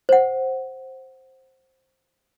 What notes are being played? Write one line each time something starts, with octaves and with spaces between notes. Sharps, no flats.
C5 F#5